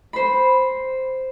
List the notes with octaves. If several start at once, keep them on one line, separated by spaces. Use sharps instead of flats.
C5 B5